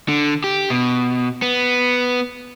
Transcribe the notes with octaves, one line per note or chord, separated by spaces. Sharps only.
D3
G4
B2
B3